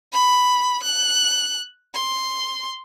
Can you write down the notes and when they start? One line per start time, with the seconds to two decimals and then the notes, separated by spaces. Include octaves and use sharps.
0.14 B5
0.83 F#6
1.93 C6